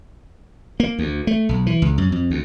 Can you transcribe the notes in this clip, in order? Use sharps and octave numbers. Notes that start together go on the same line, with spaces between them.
A#3
D2
A3
B1
E3
C#2
F#2
F2
D2